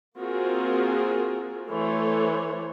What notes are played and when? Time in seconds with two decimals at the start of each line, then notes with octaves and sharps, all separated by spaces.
0.17 A#3 C4 F4 F#4 G#4 A#4
1.69 E3 A3 A4 C5 C#5